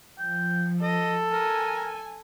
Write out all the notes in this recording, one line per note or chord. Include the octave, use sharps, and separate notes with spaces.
F3 G5
A4 D#5
A#4 G#5